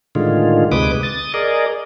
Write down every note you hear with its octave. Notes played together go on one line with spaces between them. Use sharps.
A2 D3 D#3 G#3 F4
D2 C3 G#3 B4 D6 D#6
D#6 A6
G#4 A#4 D5 D#5